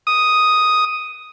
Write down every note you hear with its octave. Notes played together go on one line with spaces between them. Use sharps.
D#6